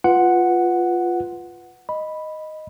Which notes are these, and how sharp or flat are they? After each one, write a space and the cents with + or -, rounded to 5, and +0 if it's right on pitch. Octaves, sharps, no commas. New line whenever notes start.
F4 +0 B4 +0 F#5 +0
D#5 +0 B5 +0